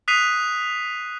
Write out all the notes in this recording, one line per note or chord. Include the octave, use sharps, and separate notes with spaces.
D#6 F#6 B6 C7 D#7 F7